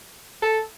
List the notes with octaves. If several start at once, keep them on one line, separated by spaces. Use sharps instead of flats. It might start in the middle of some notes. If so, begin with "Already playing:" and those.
A4